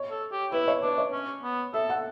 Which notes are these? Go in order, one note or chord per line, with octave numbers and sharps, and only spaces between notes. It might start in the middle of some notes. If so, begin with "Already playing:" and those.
Already playing: C#5
A4
G4
E4 B4
C#5
D4 B4
C#5
C#4
B3
A4 E5
F#5